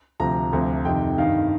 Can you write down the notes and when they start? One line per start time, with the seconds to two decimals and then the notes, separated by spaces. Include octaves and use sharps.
0.20 D2 C3 F3 A#5
0.53 D2 C3 F3
0.85 F2 C3 D#3 G5
1.18 G2 D#3 F5